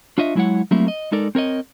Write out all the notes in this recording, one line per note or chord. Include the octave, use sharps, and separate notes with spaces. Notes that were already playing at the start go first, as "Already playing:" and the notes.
D4 F4 C#5 D#5 E5
F#3 G#3 E4 C5 C#5 F#5
F#3 G3 A3 A#3 C4 E4
D#5
G#3 D#4 A4 A#4 D5
C4 A#4 C#5 D#5